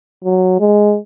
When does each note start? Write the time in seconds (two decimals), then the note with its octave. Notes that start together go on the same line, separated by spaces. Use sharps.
0.24 F#3
0.60 G#3